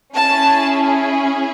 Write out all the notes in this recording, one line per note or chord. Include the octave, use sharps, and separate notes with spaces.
C#4 E4 G#4 A5